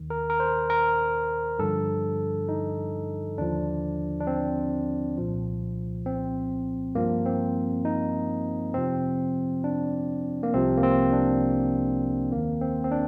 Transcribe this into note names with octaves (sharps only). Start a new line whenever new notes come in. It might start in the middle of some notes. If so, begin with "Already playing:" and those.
Already playing: D#2 D#3
A#4
A#4
C5
A#4
G2 D3 F3 A4
D#4
D#2 D3 F3 D4
D4
C4
C2 A#2 F3
C4
G2 F3 A#3
C4
D#4
F2 C3 F3 C4
D4
A#3
C2 C3 F3 C4
A#3
C4
D4
D#2 D#3 A#3
C4
C4
D4